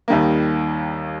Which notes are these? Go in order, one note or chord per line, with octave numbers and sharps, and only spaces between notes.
D#2 D#3 G3 A#3